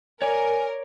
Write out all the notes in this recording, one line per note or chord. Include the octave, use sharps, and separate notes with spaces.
A#4 C#5 D5 G#5